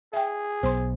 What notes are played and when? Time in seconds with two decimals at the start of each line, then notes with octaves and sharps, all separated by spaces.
0.13 G#4 E5 G5
0.63 B1 B3 C5 C6